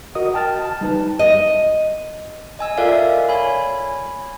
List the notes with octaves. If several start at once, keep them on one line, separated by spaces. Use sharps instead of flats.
F#4 A#4 D#5 D#6
G5 A5 F6 A6
A5
G3 D#4 B4 A5
D#5
D#5 G#5 E6
F4 A4 A#4 D5 E5 F5
C#5 G#5 B5